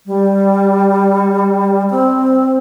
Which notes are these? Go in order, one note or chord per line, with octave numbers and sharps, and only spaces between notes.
G3
C4